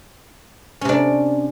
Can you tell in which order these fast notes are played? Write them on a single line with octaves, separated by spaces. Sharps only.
C#4 C3 D4